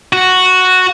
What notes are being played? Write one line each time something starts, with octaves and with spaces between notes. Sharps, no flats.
F#4